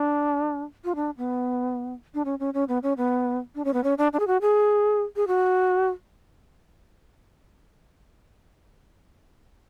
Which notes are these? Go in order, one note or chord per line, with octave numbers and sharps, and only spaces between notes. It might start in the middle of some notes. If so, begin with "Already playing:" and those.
Already playing: D4
F4
D4
B3
D4
C#4
C#4
C#4
B3
C#4
B3
D4
C#4
B3
C#4
D4
D4
G#4
F#4
G#4
G#4
F#4